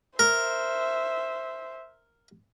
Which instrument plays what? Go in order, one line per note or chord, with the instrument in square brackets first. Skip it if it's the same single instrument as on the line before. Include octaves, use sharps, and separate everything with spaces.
[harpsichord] A#4 [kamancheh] C5 E5